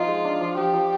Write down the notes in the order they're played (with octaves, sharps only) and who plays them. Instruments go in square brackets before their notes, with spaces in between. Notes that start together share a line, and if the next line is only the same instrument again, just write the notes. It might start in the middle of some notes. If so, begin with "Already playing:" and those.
Already playing: [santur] F3 B3 D#4 [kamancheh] F4
[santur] G#3
D4
F3
[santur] F3 [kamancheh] G4
[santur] F3